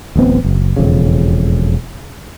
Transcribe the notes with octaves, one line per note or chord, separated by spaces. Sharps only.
D1 A1 B3 C4
F#1
E1 F2 C#3